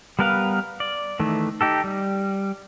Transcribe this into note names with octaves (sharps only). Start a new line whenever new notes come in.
G3 B3 A#4 B4 F5
D5
D#3 E3 A3
D#4 G4 A4
G3